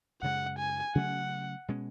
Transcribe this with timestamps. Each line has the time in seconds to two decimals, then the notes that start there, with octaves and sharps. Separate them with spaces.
0.22 F#2 C#3 G#3 F#5
0.58 G#5
0.95 C#3 F#3 A3 C#4 F#5
1.68 B2 G#3 C#4